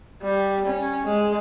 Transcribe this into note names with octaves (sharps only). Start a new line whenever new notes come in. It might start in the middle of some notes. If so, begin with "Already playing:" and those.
G3
C#4
G#3